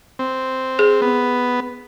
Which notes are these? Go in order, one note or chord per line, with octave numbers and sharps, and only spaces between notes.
C4
G#4
B3